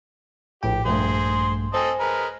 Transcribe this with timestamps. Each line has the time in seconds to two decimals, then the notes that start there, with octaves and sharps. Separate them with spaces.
0.63 A#1 A2 G4 G5
0.86 A#1 G2 A3 G#4 C5
1.74 C4 A4 C5 D#5 G#5
2.00 G#3 A#4 B4